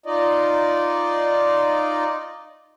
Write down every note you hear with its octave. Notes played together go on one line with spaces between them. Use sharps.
D#4 F4 D5 D#5